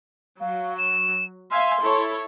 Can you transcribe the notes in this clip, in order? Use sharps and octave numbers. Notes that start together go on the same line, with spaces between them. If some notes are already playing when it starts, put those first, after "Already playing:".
F#3 F5
E7
E5 F5 G#5 C6
E4 A4 C#5